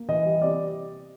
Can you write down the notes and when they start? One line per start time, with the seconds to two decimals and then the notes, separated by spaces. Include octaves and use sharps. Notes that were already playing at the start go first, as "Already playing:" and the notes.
Already playing: A#3
0.09 E3 D#5
0.25 G3
0.42 C3 D5